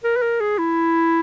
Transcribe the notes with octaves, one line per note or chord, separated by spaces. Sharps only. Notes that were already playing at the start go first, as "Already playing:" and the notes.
A#4
B4
A#4
G#4
E4